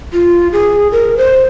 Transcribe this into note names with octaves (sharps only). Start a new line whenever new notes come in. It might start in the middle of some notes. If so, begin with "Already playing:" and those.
F4
G#4
A#4
C5